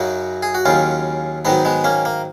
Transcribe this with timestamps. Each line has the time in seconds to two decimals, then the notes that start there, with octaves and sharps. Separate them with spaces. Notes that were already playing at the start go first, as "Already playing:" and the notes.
Already playing: F#2 C#3 F#3 D#4 F#4
0.43 G#4
0.55 F#4
0.65 D#2 C#3 F#3 C#4 F4
1.45 G#2 D#3 F#3 B3 D#4
1.65 G#3 B3
1.84 A#3 C#4
2.05 A#3